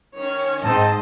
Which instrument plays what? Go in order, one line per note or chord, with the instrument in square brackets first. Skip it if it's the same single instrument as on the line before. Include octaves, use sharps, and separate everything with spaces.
[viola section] D#3 C#4 C#5
[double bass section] G#2 [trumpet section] C4 D#4 [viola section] C5 D#5 [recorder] A5